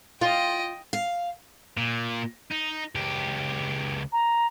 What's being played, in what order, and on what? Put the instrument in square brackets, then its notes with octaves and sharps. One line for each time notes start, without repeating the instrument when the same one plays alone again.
[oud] F4 [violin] D#5 G5
[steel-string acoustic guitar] F5
[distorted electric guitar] A#2
D#4
C#2 G4
[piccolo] A#5